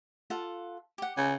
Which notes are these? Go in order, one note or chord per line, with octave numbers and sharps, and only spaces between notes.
F4 A4 F#5
G4 F#5
C#3 G#5